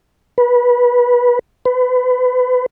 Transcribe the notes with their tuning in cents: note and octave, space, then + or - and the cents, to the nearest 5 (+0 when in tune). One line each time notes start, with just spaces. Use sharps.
B4 -20
B4 +30